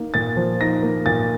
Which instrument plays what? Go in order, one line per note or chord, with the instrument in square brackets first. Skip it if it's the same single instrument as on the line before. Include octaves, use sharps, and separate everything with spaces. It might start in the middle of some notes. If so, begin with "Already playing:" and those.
Already playing: [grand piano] A#3 D#4
A#2 A6
F3
D#4 A#6
A#3
A#2 A6